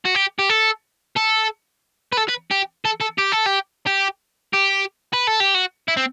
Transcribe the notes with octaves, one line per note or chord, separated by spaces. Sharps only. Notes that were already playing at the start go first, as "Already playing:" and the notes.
F#4
G4
G4
A4
A4
B4
A4
B4
G4
A4
A4
G4
A4
G4
G4
G4
B4
A4
G4
F#4
E4
C4